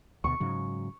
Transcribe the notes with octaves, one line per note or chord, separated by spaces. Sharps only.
D2 B2 C#6
G#2 C#3 F#3